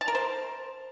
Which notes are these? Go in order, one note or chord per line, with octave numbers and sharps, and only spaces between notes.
A5
A#4
C5